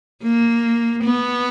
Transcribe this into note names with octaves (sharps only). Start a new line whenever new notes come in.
A#3
B3